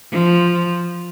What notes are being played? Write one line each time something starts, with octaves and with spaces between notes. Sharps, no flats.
F3